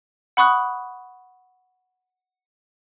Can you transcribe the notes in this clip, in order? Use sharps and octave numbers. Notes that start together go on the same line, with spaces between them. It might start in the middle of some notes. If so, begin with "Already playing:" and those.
F#5 B5 C#6 D#6 F#6